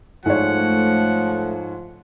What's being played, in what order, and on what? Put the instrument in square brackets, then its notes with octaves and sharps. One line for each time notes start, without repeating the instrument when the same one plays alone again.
[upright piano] G#2 C#5 [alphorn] F3 [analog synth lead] A3 [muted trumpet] F#5